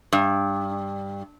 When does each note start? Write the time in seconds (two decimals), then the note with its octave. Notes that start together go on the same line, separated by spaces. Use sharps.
0.13 G2